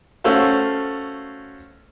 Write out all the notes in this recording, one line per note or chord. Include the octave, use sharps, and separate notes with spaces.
A3 C#4 F#4 A4 C5 F5